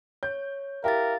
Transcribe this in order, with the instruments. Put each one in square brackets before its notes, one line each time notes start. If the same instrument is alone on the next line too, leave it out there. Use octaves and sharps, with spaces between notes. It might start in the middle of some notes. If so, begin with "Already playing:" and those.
[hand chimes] C#5 [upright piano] G6
[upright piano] E4 G4 [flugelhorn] A#4 [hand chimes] F5 A6